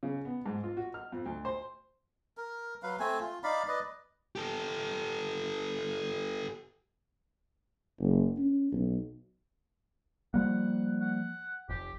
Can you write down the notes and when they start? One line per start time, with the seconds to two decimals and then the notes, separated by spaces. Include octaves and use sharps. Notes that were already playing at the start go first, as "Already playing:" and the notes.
0.03 C#3
0.25 B3
0.46 G#2
0.64 F4
0.77 F#4
0.94 F6
1.12 F2
1.26 D2
1.45 C5
2.37 A#4
2.83 F#3 B4 F5
3.00 A3 C4 G#5
3.20 F4
3.44 D#4 D5 F5 B5
3.68 B4 D5 D#5
4.36 G4 A4
8.00 F#1
8.38 C#4
8.72 B1
10.34 F3 G3 A#3 F#5
11.01 F#5
11.69 F1 G4